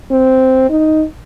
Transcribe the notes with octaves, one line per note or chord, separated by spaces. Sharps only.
C4
D#4